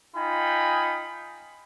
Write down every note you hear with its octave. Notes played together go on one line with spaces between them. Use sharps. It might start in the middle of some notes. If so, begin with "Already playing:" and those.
D#4 F4 D#5 G5 G#5 B5